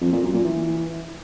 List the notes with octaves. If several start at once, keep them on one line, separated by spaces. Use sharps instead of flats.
F2
A#2
F#2
A#2
E3